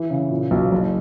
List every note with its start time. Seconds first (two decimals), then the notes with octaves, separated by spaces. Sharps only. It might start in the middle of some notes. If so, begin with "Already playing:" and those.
Already playing: E3
0.10 C#3
0.31 A#2
0.51 B1
0.72 F#1